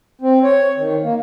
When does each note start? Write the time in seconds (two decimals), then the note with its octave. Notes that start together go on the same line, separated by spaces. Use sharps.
0.21 C4
0.43 C#5
0.77 D#3
1.03 A#3